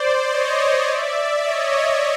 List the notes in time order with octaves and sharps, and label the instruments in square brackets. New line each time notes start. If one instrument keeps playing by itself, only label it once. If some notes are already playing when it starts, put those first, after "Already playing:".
Already playing: [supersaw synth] C5 D5
C#5 D#5
D5 E5
D5 E5
C#5 D#5